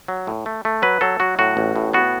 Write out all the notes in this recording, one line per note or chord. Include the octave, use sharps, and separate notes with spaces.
F#3
A2
A3
A3
F#3 B4
F#3 A4
F#3 F#4
A2 F#4
A1
A2
B3 F#4